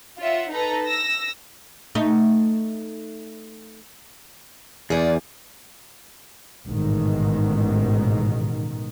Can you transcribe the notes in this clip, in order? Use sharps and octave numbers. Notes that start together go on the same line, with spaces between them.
F4 C#5 E5 F#5
D#4 A4 B4 A#5
E6 A#6
A3 D#4
E2 G#4 D5
A1 G#2 B2 D#3